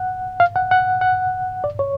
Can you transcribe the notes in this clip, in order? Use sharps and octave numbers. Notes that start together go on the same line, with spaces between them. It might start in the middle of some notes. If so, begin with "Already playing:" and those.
Already playing: F#5
F5
F#5
F#5
F#5
D5
C#5